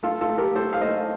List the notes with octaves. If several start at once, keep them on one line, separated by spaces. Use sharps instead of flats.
A3 F4 A4
F4 A4
A3
G4 A#4
A3 A4 C5
F5
A3 C5 D#5